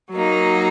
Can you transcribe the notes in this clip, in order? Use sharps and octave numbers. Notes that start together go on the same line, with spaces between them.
F#3 A#3 D#4